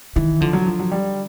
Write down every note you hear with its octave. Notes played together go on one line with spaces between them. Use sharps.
D#3 E3
D3 F3
F#3
F3
F#3
G3